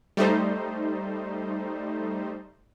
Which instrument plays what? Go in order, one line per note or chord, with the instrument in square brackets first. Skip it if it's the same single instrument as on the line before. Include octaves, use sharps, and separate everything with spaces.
[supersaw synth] G3 A3 D#4 C5